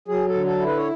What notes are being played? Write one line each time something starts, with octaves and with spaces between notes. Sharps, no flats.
F#3 G#4
A4
D3
A4
E4
B4
C#5